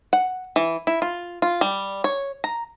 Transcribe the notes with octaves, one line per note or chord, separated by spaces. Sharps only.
F#5
E3
E4
F4
F4
G3
C#5
A#5